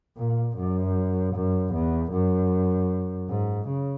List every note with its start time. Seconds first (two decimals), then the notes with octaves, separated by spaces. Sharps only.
0.17 A#2
0.57 F#2
1.34 F#2
1.73 E2
2.12 F#2
3.29 G#2
3.68 C#3